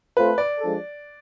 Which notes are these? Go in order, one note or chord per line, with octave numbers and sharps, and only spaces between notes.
A3 C4 F4 A4 B4 C5
D5
F3 G#3 D4 A4